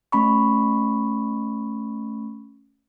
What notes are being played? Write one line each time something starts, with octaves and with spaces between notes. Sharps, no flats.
A3 C#4 B5 C#6